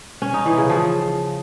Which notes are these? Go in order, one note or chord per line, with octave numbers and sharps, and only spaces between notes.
C#4
D#4
E3
C#3
F3